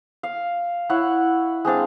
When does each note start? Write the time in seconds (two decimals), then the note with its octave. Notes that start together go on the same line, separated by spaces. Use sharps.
0.23 F5
0.89 E4 C#5 F#5
1.65 G#3 C4 D4 F5